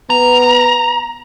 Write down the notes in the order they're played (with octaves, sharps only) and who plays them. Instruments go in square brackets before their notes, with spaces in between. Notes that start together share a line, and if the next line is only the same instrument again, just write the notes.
[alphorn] B3 [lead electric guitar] A#5